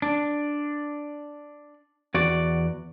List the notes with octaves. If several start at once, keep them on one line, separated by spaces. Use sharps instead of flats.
D4
E2 F#4 D5